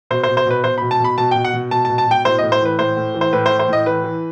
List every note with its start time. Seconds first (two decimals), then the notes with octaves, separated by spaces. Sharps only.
0.10 B2 C5
0.23 C5
0.28 B2
0.37 C5
0.46 B2 B4
0.64 B2 C5
0.78 B2 B5
0.91 A5
1.00 B2 B5
1.18 B2 A5
1.31 B2 G5
1.44 F#5
1.53 B2
1.71 B2 A5
1.85 A5
1.90 B2
1.98 A5
2.07 B2 G5
2.25 A2 C5
2.38 D#5
2.43 A2
2.52 C5
2.61 E3 B4
2.79 A2 C5
2.97 A2
3.14 E3
3.21 C5
3.33 A2 B4
3.46 C5
3.50 E3
3.59 C5
3.68 A2 D#5
3.86 E3 B4
4.04 E3